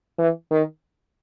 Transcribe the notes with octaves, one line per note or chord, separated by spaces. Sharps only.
E3
D#3